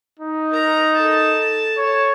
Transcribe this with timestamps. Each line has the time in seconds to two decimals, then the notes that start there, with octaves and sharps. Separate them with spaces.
0.19 D#4
0.51 A#4 A#5
0.95 A4 A5
1.78 C#5